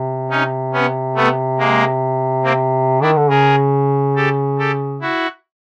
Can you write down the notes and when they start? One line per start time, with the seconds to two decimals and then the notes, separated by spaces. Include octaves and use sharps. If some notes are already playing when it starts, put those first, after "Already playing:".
Already playing: C3
0.30 C#4 D#4
0.73 B3 C#4
1.15 A3 B3
1.59 G#3 A#3
2.44 A#3 C4
3.01 D#3 D4 E4
3.16 D3
3.30 C#3 G#4 A#4
4.16 G4 A4
4.59 G4 A4
5.01 E4 F#4